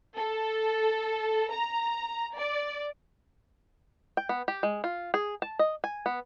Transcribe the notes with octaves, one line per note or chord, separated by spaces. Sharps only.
A4
A#5
D5
G5
B3
G4
G#3
F4
G#4
A5
D#5
G#5
B3